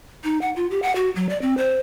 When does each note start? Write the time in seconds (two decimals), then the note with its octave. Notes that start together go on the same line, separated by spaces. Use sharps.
0.24 D#4
0.42 F#5
0.56 F4
0.71 G4
0.83 F#5
0.96 F#4
1.16 F#3
1.29 D5
1.42 C4
1.58 C5